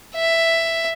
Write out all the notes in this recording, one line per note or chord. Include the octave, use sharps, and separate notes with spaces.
E5